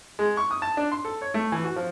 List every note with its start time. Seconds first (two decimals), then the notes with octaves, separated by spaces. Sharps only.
0.19 G#3
0.37 C#6
0.51 D#6
0.62 A5
0.77 D4
0.92 C6
1.05 A4
1.21 C#5
1.34 A3
1.52 E3
1.64 F#4
1.76 F3